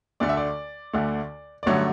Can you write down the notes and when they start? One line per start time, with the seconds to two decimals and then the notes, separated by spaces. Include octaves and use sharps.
0.20 D2 D3 A3 D5
0.29 E5
0.37 D5
0.93 D2 D3 A3
1.63 D5
1.66 A1 G2 D3 F#3 A3 C#5